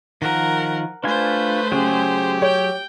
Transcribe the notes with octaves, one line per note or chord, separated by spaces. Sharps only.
D#3 F3 A#4 F#5
A3 D4 F4 B4 C5 G#5
C#3 F#3 G4 G#4
C#5 G5